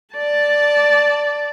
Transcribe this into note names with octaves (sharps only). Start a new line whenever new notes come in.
D5 A5